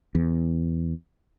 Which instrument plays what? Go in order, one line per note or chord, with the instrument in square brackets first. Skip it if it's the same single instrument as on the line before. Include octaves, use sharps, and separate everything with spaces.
[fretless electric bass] E2